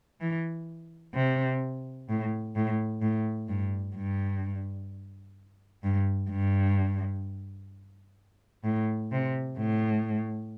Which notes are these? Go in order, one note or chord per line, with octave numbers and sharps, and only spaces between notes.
E3
C3
A2
A2
A2
G2
G2
G2
G2
A2
C3
A2